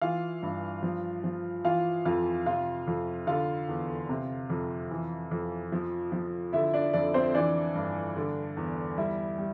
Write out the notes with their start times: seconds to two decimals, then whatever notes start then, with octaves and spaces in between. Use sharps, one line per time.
0.02 E3 F4 F5
0.43 G2
0.83 F3
1.24 F3
1.64 E3 F4 F5
2.05 F2 F4 F5
2.46 C3 F4 F5
2.87 F2
3.27 D3 F4 F5
3.68 E2
4.09 C3
4.50 F2
4.91 E3
5.31 F2
5.72 F3
6.12 F3
6.53 D3 E4 E5
6.74 D4 D5
6.93 F2 D4 D5
7.14 C4 C5
7.34 E3 D4 D5
7.75 G2
8.16 D3
8.57 E2
8.97 G3 E4 E5
9.38 G3